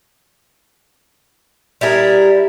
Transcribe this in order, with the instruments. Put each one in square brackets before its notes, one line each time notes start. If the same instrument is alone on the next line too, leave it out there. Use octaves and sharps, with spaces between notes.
[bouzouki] G3 E4 G#4 A#4